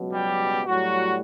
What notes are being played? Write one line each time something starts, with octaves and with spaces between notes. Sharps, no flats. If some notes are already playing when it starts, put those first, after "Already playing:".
Already playing: C#2 B2 F#3
G3 G4
A2 F#3 G3 F#4